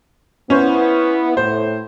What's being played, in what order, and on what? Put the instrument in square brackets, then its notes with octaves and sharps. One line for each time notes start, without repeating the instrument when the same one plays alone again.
[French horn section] B3 E4 [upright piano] C#4 C5
[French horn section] A2 [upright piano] C5